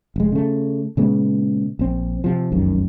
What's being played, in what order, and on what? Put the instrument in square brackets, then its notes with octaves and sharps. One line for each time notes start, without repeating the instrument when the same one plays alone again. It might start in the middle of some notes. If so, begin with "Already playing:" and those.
[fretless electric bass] F1 G#3
C#3 A3
A#2 C#3 G#3 B3
A#1 C4
C3 F3
F1 C2 F#2 D#3